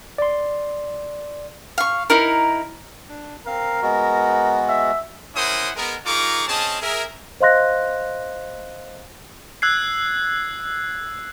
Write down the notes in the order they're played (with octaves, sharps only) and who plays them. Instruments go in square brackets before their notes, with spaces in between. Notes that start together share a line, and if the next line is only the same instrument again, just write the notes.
[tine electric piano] D5 C6
[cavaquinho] F5 C#6
D#4 E4 A#4
[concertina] D4
[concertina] C4 F5 [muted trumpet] A#4
[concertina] G#3 B3 F#4
[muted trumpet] E5
[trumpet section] C#4 E4 A#4 C5 F#5 D#6
G#3 B3 A#4
D#4 F4 G#4 A#4 C#6 D6
C4 C#4 G#4 D#5 A5
G#4 A#4 E5
[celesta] C5 D#5 F5 C6 F#6 A#6
[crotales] E6 F#6 G#6 C7